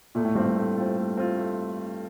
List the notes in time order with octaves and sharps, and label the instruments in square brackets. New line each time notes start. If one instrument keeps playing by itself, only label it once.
[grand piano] A#2 [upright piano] A3
[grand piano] A2
[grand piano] G2 [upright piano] C4 F4
[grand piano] G2
[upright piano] A3
C4 F4
A3
C4 F4
A3